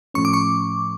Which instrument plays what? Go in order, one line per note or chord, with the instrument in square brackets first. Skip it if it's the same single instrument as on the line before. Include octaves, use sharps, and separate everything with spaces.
[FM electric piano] A2 F3 A3 C#4 [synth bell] C#6
[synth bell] D6
C#6